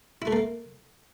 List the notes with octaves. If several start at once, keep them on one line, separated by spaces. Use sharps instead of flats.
E4
A3
A#3